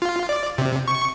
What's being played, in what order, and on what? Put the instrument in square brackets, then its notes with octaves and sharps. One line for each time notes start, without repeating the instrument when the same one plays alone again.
[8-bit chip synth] F4
D5
C3
C#6